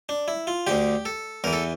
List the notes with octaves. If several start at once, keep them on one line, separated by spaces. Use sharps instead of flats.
D4
E4
F4
D2 D3 G4
A4
E2 E3 A#4
A4